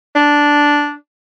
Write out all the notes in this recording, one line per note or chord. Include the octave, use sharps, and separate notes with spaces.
D4